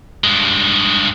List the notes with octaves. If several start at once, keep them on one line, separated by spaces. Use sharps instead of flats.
G2 G#3